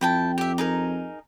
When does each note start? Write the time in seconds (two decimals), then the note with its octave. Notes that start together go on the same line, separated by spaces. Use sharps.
0.01 F2 E4 G5 A5
0.38 G4 E5
0.58 D#4 G#4 A#4